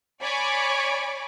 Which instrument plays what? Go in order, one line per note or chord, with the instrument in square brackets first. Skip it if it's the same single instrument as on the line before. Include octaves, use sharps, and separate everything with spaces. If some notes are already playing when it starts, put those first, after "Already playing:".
[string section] C#5 D5 G#5 B5 C#6 D6